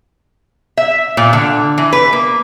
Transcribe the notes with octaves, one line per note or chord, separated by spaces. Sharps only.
E5
A#2
D3
E3
B4
A#3